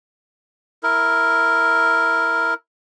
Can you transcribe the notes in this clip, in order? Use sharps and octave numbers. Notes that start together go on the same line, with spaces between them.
E4 A#4